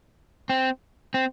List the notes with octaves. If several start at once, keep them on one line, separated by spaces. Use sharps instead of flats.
C4
C4